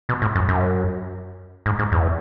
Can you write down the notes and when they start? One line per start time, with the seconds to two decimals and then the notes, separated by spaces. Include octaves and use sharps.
0.09 B2
0.22 A2
0.35 F#2
0.49 F#2
1.66 G#2
1.79 G#2
1.92 E2